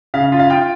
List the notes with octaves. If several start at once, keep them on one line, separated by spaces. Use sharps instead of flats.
C#3 F5
F4
F5
F4 G5